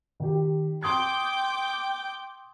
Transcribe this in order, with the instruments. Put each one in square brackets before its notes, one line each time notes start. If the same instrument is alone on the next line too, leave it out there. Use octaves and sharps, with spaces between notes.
[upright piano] D#3 G4
[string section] G5 D6 G6 [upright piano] C6 D#6 G#6